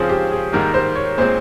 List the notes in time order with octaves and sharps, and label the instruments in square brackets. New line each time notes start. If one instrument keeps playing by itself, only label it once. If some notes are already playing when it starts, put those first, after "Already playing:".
Already playing: [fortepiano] C#3 F3 C4 [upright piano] G#4 C5 C#5
[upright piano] G4
G#4
[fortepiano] G#2 D#3 G3 A#3 [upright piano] A#4
[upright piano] C5
C#5
[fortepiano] A#2 G#3 C4 [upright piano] C5